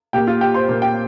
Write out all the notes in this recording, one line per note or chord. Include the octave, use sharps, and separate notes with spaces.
A#2 A#3 G4 G5
F4 F5
G4 G5
C5 C6
A#2 A#3
G4 G5